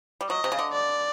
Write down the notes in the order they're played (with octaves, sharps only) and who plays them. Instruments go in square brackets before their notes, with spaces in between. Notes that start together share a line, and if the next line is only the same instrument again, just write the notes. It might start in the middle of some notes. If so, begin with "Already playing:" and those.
[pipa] G3
[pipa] F#3 [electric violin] D#5
[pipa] C3
C#3
D3
[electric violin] D5